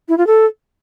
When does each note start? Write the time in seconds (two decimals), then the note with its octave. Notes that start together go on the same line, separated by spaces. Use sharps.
0.09 E4
0.18 F4
0.27 A4